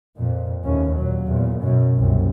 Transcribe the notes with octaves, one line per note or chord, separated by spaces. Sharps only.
F2 A#2
D#2 A2 C#4
A#2 F#3
E2 A#2
F#2 B2
C2 F#2 A#2